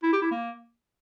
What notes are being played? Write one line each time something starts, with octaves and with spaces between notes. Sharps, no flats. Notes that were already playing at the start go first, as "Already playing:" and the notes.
E4
G4
E4
A#3